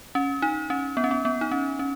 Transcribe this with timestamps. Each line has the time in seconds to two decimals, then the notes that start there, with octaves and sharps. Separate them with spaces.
0.15 C#4
0.42 D#4
0.70 C#4
0.97 B3
1.04 C#4
1.11 B3
1.25 B3
1.41 D#4
1.51 C#4
1.79 C#4